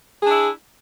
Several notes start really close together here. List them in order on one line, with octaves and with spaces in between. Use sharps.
G#4 D4 E4